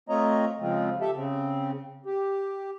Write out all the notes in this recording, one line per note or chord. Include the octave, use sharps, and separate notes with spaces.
A3 C4 F4 C#5 D#5 A#5
C#3 F3 G#3 C4 F4
G4 A4 E5
C#3 C4
G4